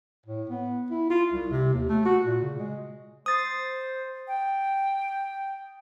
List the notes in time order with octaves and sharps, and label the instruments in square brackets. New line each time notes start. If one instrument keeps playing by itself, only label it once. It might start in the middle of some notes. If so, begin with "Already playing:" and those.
[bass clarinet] A2
B3
E4
F4
C2
C3
D#2
A3
F#4
A#2
C#3
G#3
[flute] C5 [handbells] D#6 A6
[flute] G5